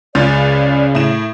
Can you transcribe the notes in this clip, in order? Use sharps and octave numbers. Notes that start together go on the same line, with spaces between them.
C#2 C#3 F4 D5 A6
A2 E7